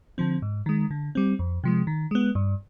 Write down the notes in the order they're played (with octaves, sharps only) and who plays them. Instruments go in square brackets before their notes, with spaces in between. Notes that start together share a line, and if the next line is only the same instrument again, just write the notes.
[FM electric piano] D3 F3 C4
G#2
D#3 G#3
D3
G3 C4
F2
C3 F3 G#3
D#3
G#3 B3
G2